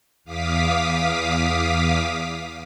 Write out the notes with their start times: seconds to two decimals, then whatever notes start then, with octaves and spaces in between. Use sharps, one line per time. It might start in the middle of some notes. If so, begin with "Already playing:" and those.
0.24 E2 F5 D6 D#6 B6